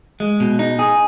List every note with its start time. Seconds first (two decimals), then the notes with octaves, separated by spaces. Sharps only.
0.20 G#3
0.40 B2
0.59 D#4
0.79 G#4